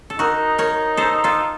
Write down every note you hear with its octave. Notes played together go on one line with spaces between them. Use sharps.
A4
D#4 F#4 A#4
A#4 C#5
A4 C5
F4 A4